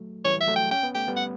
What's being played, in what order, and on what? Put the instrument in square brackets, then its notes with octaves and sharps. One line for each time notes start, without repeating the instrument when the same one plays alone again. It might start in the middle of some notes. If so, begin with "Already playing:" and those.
Already playing: [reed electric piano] F#3 A3
[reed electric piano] E3 G3 [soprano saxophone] C#5
[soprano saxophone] E5
[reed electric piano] F#3 A3
[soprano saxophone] G5
[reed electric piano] C#4 [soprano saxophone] G5
[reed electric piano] B3
[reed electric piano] A3 [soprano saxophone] G5
[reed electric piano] G3 B3
[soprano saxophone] F#5